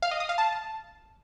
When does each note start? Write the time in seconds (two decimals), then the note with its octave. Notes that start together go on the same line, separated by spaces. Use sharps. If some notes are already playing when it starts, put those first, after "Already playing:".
0.02 F5
0.11 D#5
0.20 D#6
0.29 F5
0.38 A5